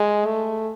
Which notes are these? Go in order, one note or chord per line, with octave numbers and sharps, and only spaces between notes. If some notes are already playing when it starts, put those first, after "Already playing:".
Already playing: G#3
A3